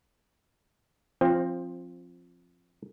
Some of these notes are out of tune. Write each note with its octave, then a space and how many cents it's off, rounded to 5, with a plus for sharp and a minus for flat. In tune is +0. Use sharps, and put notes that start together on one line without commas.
F3 +0 C4 +20